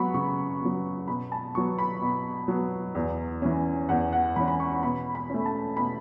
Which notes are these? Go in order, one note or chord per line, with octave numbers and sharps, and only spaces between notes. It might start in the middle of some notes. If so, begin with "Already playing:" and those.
Already playing: F#3 B3 F#5 B5 C#6
C#3 C#6
B3
F#3
B2 B5
A5
F#3 B3 C#6
B5
B2
F#3 B3
E2
E3 C#4
E2 F#5
F#5
E3 C#4 B5
B5
C#6
B2 B5
B5
A3 C#4
A5
B2 B5